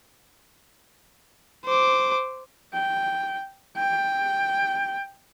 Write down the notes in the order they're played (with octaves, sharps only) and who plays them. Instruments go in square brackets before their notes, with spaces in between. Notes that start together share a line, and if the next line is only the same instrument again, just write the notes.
[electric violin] C5 D6
[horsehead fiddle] G5
G5